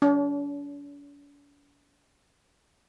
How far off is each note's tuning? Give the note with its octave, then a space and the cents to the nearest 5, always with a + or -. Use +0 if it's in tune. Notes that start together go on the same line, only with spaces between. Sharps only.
D4 -45